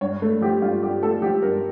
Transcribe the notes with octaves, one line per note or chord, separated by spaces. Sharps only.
G2 C#5
A3
F3 G4
G2 F4
G2 G4
A3 A4
F3 G4
G2 A#4